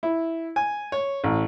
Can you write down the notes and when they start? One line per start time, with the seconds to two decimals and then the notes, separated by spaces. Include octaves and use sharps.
0.03 E4
0.56 G#5
0.92 C#5
1.24 A1